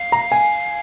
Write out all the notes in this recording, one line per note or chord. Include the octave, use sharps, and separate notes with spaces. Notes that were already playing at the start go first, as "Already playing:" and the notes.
Already playing: F5
A#5
G#5